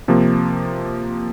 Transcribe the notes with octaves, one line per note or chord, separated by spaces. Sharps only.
C3 F3 A#3